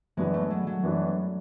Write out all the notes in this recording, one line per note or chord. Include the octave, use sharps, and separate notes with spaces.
F#2 E3 G#3 B3 D4 F#4
A3
F#3
F#3
F#2 E3 B3 D4 F#4